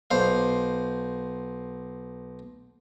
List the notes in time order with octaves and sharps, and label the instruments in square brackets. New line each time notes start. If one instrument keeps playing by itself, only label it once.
[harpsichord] B1 C5 F5